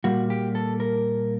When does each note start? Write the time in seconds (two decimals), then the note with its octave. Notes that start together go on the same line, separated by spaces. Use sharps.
0.04 A#2 G3 A#3 F#4
0.30 G4
0.55 A4
0.80 A#4